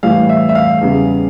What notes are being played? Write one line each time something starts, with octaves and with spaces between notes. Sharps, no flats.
A2 E3 G3 F5
E5
E5
F5
E2 C#3 G3